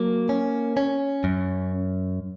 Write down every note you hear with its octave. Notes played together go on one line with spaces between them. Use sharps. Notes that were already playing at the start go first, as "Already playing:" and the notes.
Already playing: F#3 A#3
C#4
C#4
F#2